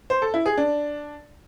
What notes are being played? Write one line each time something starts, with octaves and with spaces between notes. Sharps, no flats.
C5
A4
E4
G#4
D4